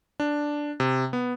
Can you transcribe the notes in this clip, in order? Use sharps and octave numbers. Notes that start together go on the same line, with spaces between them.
D4
C3
B3